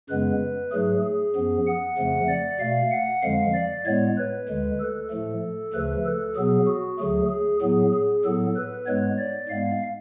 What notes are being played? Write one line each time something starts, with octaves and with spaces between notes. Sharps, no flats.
F#2 C#3 G#3 B3 B4
G#2 F#3 A3 G#4
G#4
F#2 F3 B3
F#5
F2 C#3 F3 A3
D5
B2 A3 F5
F#5
F2 D3 F3 G#3 F5
D5
A2 G#3 B3 C#5
B4
D2 D3 G#3
A4
A2 F3 A3
D2 C#3 F3 A3 B4
A4
B2 F#3 B3 G#4
F#4
D2 D3 F#3 A3 G#4
G#4
A2 F#3 B3 G#4
G#4
A2 F#3 B3 A4
B4
G#2 G#3 B3 C#5
D5
G#2 G#3 B3 F5